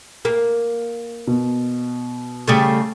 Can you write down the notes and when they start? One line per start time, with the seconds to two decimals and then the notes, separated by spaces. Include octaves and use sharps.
0.25 A#3
1.27 B2
2.48 C#3 G3 A3